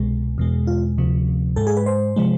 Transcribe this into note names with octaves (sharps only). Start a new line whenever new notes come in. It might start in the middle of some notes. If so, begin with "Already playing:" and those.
Already playing: C2 B2 G#3
E2 B2 G#3
F4
D2 C3 F3
G#2 G#3 A4
G#4
B4
C5
C3 F3 G#3